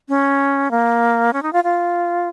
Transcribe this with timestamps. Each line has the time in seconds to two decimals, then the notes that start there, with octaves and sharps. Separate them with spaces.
0.09 C#4
0.71 A#3
1.33 C#4
1.43 D#4
1.53 F4
1.64 F4